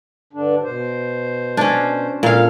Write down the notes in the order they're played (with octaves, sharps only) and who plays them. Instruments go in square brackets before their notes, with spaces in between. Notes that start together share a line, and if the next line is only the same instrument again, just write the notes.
[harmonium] G2 D3 D4
B2 C5
[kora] C#4 D4
[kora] A#2 F5 [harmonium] A4